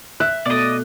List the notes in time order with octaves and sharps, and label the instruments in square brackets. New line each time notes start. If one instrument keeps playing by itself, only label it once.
[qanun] E5 [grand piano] F#6
[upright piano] B2 A3 [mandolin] D5 D#5